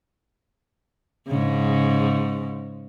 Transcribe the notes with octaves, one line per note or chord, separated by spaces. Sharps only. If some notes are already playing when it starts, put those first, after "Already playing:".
G#2 C#3